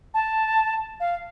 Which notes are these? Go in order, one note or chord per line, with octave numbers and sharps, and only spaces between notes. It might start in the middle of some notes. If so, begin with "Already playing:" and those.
A5
F5